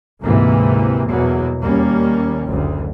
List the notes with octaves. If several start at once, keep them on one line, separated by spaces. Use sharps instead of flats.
D2 G#2 C3 E3 A#3
E2 B2 F#3 A#3
D#2 G3 A#3 C#4
F#1 D2